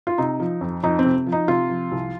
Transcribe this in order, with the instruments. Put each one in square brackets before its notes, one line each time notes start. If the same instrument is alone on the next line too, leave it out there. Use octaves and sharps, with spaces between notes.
[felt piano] F4
C3 D#4
F3
F2
F2 D#4
C4
C3
F3
D#4
C3 F4
F3
C2